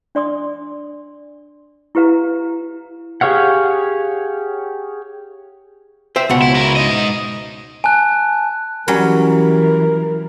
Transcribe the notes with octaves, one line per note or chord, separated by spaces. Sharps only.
D4 D5 C6 D#6
E4 G4 B4 F5 A#5
G4 G#4 C#5 F5 F#5
C5 E5 G5
C#2 B2 F#5
E4
E4 A#4
G#2 D#5
G#5 A5 F#6
E3 F#3 G3 C#4 A#4